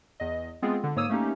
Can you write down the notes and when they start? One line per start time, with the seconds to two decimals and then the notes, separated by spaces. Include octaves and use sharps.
0.20 E2 D#5
0.62 G#3 B3 C4 F4 G#4
0.83 D3
0.96 G#2 A#3 C#5 D#6 E6 D#7
1.10 A3 A#3 C#4 D#4 G4